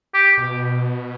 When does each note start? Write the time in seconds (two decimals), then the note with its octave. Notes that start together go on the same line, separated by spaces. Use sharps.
0.14 G4
0.37 B2